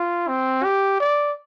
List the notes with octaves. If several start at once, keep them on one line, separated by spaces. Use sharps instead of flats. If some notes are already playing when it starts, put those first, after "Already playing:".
Already playing: F4
C4
G4
D5